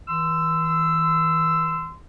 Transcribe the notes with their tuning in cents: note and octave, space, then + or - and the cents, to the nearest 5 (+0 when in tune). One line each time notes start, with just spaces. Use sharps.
E3 -35 C6 -25 E6 +5